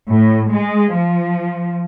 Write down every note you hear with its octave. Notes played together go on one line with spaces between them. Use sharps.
A2
G#3
F3